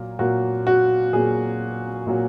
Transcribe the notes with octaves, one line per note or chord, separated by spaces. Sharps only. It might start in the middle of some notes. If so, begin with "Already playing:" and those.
Already playing: A#2 F#3 A#3
A#2 F#3 A#3 F#4
F#4
A#2 F#3 A#3 G#4
A#2 F#3 A#3